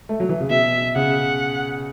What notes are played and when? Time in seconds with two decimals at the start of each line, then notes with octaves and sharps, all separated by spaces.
0.09 A3
0.20 F#3
0.29 E3
0.41 C#3
0.50 B2 E5
0.95 C#3 F#5